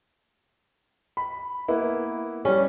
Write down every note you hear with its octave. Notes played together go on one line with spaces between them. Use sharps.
B5
A#3 B3 E4
G3 C#4